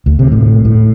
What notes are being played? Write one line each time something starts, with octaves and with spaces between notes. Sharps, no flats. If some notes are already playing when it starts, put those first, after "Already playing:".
D2
C3
A2
A2